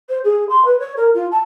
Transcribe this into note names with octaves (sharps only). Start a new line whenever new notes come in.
C5
G#4
C6
B4
C#5
A#4
F4
A5